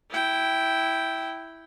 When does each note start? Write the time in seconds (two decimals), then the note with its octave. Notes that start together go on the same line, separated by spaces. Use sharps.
0.10 E4 G5